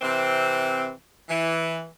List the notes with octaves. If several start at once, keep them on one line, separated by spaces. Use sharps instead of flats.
C3 E3 C4
E3